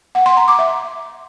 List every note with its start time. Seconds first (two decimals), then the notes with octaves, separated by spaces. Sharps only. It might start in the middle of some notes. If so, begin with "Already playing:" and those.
0.15 F#5
0.26 C6
0.37 A#5
0.48 D6
0.59 E5